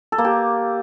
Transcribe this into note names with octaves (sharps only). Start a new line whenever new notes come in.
A4
A#3
G4